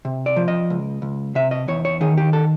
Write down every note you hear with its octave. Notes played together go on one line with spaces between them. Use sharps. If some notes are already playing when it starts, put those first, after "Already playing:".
C3
D5
F3
D#5
C#2
C#2
C3 E5
D#5
E2 C#5
C#5
D#3 G#4
G4
A4